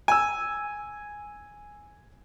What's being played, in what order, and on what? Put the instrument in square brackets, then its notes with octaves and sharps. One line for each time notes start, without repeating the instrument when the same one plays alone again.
[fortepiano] G#5 E6